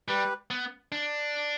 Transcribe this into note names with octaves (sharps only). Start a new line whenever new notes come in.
G3 G4 B4
B3
D4